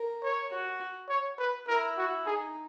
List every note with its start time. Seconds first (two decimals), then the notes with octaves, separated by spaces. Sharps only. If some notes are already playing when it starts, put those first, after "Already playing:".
Already playing: A#4
0.23 C#5
0.51 F#4
1.09 C#5
1.39 B4
1.68 E4 A#4
1.98 F#4
2.26 D#4 G#4